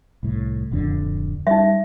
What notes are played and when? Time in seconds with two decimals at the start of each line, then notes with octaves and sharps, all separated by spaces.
0.23 C2 A2
0.71 D1 F2 D3
1.47 G3 D#4 E5